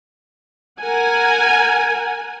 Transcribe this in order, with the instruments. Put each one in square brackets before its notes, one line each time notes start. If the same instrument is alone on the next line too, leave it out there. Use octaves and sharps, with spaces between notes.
[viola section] A#4 F#5 G#5